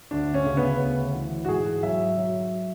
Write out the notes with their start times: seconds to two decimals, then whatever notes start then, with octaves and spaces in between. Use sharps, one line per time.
0.11 D2 D4
0.34 C#4
0.46 C#3
0.57 B3
0.80 D2
1.15 E3
1.45 F#4
1.49 G#2 G#4
1.83 F#3 E5
2.17 F#3